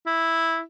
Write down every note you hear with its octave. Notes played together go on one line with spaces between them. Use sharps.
E4